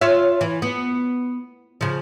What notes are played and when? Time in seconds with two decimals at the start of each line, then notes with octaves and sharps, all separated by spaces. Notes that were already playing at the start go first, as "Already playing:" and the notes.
0.01 F4 C#5 E5
0.41 E3
0.62 B3
1.81 C#3 F3